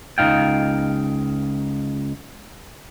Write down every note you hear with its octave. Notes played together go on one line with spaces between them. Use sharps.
C#2 F#3 D#4 F5 G5